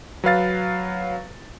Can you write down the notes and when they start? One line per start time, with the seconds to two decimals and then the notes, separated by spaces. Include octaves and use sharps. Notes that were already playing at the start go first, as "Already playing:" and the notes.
0.24 F#3 B4 F5 A6